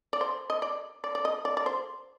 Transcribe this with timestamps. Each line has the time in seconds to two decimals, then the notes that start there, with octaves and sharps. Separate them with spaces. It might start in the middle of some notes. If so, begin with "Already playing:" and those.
0.13 D5
0.21 C5
0.50 D#5
0.62 D5
1.04 D5
1.15 D5
1.25 D#5
1.45 D5
1.57 D5
1.66 C5